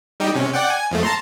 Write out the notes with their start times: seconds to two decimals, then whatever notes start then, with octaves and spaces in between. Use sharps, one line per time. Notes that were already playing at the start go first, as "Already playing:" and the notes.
0.20 G3 D#4 G4
0.35 C3 C#4
0.54 D5 F#5 G5
0.70 G#5
0.91 F2 F3 A3
1.03 A5 A#5 C6